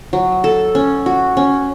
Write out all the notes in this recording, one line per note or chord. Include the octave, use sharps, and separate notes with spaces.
F#3
A4
C#4
F#4
C#4